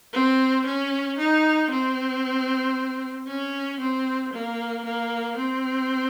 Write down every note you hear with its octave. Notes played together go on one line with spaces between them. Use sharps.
C4
C#4
D#4
C4
C#4
C4
A#3
A#3
C4